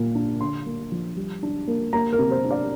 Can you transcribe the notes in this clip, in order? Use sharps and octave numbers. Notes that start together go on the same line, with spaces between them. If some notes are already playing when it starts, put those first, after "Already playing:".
Already playing: A#2 A#3
D4
D3 C6
A#3
F3
G3
D4
A#3
A#3 A#5
A#4
C3
C5
D4
D5